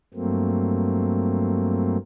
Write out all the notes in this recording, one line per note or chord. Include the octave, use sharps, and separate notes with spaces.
G2 F#3 A3 A#3 C4